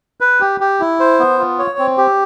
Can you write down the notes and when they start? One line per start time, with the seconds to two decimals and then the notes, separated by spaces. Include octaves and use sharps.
0.20 B4
0.40 G4
0.61 G4
0.80 E4
1.00 C5
1.19 B3
1.39 F4
1.59 C#5
1.79 C4
1.98 G4